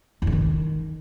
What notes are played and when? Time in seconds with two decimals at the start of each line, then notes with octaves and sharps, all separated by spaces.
0.22 E2
0.27 D3
0.32 D#3